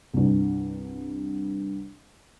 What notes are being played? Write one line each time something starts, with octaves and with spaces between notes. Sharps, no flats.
C2 G2